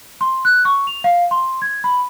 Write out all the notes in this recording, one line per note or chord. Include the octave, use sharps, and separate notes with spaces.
C6
F#6
C#6
F7
F5
C6
G#6
B5